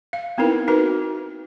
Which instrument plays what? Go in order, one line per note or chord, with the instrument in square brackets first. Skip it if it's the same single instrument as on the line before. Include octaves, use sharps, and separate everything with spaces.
[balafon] F5
B3 C4 D#4 E4 A#4 B4
D#4 F#4 A#4 B4